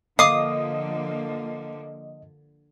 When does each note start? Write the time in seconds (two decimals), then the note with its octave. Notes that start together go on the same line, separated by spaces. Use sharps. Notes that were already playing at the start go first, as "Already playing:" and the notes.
0.19 D3 F3 A#3 D#5 F5 D6 D#6 C7